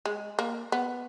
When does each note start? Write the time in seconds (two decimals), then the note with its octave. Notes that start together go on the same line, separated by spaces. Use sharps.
0.05 G#3
0.39 A#3
0.72 B3